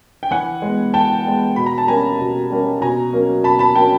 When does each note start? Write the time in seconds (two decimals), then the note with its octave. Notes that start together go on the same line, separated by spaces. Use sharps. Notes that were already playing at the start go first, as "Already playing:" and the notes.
0.23 G5
0.31 E3 F#5 G#5
0.62 G#3 B3
0.94 E3 G5 A5
1.26 G#3 B3
1.56 B2 B5
1.66 A#5
1.78 A5
1.87 G3 A#3 C#4 G#5 A#5
2.19 B2
2.51 G3 A#3 C#4
2.81 B2 G#5 A#5
3.13 F#3 A#3 C#4
3.44 B2 A5 B5
3.59 A5 B5
3.75 F#3 A#3 C#4 G5 A5